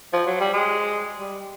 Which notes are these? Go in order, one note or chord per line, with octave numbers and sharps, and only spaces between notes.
F3
F#3
G3
G#3
G3